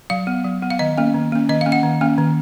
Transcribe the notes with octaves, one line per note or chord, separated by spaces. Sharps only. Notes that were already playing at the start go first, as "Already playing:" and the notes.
F#3 F5
B3
F#3
B3
F5
D#3 D#5
A#3 C#4
D#3
A#3 C#4
D#3 D#5
F5
A#3 C#4
F#5
D#3
A#3 C#4
D#3